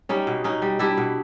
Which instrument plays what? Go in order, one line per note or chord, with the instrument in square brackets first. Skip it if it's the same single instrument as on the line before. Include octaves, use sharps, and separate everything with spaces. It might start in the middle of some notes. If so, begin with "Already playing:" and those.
[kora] G3 C#4 D#4
B2
B2 C#4 D#4
G3
G3 D4 E4
B2